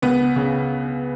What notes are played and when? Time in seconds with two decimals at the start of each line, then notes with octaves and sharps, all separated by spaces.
0.02 C#2 B3
0.36 C#3